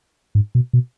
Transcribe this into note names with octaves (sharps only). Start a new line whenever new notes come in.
G#2
B2
B2